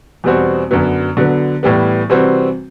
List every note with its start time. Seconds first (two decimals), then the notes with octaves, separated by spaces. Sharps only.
0.24 E2 B2 G3 C4 F#4
0.71 F#2 D3 F#3 B3
1.17 D3 F#3 B3
1.63 A2 E3 G3 B3
2.10 C3 E3 G3 C4 F#4